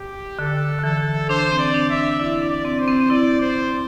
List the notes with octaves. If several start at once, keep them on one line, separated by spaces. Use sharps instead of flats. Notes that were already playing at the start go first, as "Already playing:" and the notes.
Already playing: G4
D3 A4
D3
E3 A4
D4 C5
C4
D5
D4
E5
D4
E4 D5
D4
D5
C4
C5
C4
E4 D5
C5